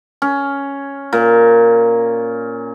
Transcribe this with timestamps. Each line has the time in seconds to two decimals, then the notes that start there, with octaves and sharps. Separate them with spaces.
0.22 C#4
1.13 A#2